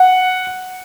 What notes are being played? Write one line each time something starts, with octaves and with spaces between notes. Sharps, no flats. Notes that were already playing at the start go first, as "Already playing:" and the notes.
Already playing: F#5